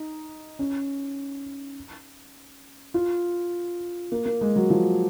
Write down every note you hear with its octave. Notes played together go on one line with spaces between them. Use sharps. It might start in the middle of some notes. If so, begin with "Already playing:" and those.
Already playing: D#4
C#4
F4
A#3
A#3
G#3
F#3
F3